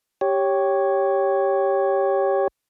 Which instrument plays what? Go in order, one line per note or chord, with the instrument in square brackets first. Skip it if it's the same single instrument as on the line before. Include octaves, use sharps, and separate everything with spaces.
[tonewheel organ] G4 C#5